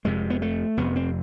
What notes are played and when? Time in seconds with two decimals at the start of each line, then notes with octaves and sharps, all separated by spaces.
0.05 F1 F2 C3 G#3
0.30 B3
0.42 A3
0.77 F1 F2 C3 B3
0.96 C4